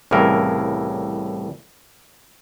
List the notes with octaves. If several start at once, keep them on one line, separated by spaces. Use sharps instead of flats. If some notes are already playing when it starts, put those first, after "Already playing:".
C2 A2 C#3 E3 A#4